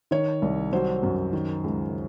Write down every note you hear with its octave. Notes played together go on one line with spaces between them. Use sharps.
D#3 C#5
C2
F#3 C5
F#2
D#3
C#2